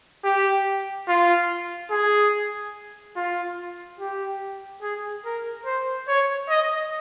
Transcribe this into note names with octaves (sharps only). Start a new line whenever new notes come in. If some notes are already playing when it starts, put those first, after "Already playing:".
G4
F4
G#4
F4
G4
G#4
A#4
C5
C#5
D#5